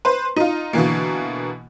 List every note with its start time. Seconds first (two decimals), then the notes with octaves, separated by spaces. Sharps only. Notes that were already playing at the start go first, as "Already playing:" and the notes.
0.05 B4 C5
0.36 D#4 F4
0.73 B2 D3 E3 A#3